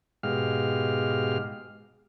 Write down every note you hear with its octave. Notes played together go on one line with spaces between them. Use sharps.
G#2 B2 G#3 G4 F5 F6